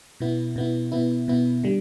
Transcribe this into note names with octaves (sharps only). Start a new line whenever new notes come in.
B2 B3 E4
B2 B3 E4
B2 B3 E4
B2 B3 E4
D3 G3